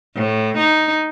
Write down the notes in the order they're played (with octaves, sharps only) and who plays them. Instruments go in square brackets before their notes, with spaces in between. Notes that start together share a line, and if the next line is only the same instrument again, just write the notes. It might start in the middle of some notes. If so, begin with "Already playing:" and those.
[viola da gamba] A2
D#4